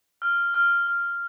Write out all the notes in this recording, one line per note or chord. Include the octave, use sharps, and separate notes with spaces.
F6
F6
F6